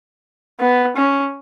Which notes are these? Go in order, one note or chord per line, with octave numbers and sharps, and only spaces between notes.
B3
C#4